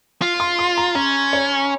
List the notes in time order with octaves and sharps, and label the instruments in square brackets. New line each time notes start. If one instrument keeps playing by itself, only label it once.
[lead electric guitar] F4
[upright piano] C6
C6
A#5
[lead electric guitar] C#4 [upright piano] A#5
[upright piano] C#5